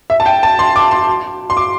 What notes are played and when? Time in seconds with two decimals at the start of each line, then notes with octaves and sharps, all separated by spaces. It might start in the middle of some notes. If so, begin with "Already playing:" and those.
0.10 E5
0.20 A5
0.26 G5
0.43 A5
0.59 C6
0.76 D6
0.91 C6
1.50 C6
1.57 D6